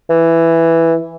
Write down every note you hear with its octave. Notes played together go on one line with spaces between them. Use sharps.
E3